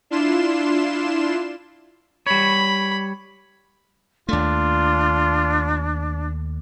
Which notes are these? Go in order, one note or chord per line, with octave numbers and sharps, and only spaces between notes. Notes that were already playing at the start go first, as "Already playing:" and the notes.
D4 E4 F4 C6 E7
G3 C#5 B5
D#2 A3 D4 F4